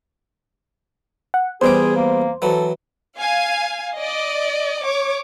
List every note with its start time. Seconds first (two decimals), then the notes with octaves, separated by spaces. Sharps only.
1.34 F#5
1.61 E2 G3 G#4 C5 D6
1.96 A#3
2.42 E3 F#3 A4
3.19 F5 G#5
3.98 D5 D#5
4.83 C#5 D6